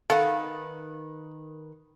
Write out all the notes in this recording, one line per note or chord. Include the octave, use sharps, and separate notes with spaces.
D#3 A4 B4 F5 F#5